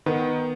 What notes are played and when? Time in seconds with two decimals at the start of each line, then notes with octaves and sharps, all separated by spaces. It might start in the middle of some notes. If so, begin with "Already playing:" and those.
0.06 D#3 B3